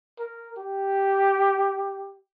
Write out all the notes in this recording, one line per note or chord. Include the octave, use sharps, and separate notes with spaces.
A#4
G4